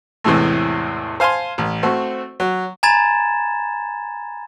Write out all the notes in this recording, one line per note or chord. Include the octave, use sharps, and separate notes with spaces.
E2 A2 C3 E3 G#3 A3
C5 F5 G#5 A5 C6
A1
A3 C4 F#4
F#3
G#5 A#5 B5 G#6 A6 E7